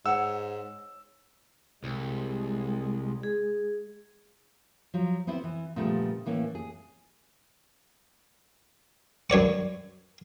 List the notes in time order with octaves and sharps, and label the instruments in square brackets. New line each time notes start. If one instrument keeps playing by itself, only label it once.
[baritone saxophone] G#2 [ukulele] C#5 F#5 [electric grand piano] E6
[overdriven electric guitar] C2 [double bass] G#3
[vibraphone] G#4
[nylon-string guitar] F3 F#3
B3 C4 E4 C5
E3
A#2 C#3 F3 G3 A3 B3
A2 E3 A#3 C#4
G#4
[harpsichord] F#2 C#5 D5 C#6